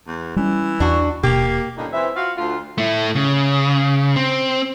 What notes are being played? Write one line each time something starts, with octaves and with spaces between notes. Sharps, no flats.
E2
E3 G3 C#4
E2 D4 F#4
D#1 B2 A#3 G4
G2 A#2 D3 D#3 C#4 D#4
E3 C4 E5
F4 F#4 F5
D2 F4
A3 E4
C#3
C4